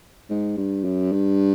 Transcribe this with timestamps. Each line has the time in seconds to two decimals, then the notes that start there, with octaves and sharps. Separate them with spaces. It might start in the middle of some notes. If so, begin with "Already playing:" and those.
0.30 G#2
0.57 G2
0.84 F#2
1.12 G2